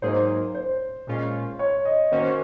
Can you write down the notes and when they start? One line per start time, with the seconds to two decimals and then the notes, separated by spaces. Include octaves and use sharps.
0.02 G#2 F#3 A#3 D#4 G#4 C5
0.55 C5
1.07 A#2 G#3 C#4 F4
1.59 C#5
1.85 D#5
2.12 D#3 A#3 C#4 F#4 C5